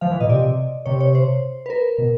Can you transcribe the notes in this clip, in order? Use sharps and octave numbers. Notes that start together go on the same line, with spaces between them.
F3 F5
E3
A#2 D#5
C3 D5
C3 C#5
C#5
C5
B4
A#4
B2